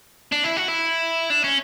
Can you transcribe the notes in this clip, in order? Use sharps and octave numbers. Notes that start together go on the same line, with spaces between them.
D4
E4
F#4
E4
D4
C#4